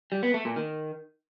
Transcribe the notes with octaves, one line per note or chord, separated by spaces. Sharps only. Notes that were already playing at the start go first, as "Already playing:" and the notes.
G3
B3
A3
A#2
D#3